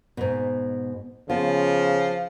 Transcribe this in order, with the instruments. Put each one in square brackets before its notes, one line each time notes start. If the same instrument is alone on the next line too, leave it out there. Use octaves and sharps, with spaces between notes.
[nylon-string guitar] G#2 B2
[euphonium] C#3 [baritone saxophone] F3 [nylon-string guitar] B3 F4